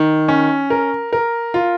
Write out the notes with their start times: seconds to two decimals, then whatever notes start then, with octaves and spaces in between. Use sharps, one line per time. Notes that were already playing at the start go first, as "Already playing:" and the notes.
Already playing: D#3
0.28 C#4
0.70 A#4
1.13 A#4
1.54 F4